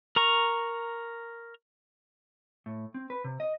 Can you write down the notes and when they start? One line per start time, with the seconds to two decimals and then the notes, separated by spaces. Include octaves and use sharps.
0.16 A#4 A#5 C#6
2.66 A2
2.94 C4
3.10 B4
3.24 C3
3.40 D#5